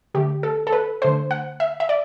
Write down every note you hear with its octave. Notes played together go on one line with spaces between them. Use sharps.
D3 A3 G4
A4
A4
B4
D3 A3 C5
F#5
E5
E5
D5